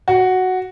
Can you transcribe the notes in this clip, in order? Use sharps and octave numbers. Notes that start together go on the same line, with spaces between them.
F#4